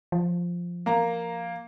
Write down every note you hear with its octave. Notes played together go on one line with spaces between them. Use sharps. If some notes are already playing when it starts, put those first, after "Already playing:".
F3
A#3 A#5